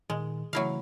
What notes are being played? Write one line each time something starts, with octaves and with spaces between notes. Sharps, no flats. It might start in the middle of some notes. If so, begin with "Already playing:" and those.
A#2 D#3 G#3
C#3 E3 F#3 A3 E4 F5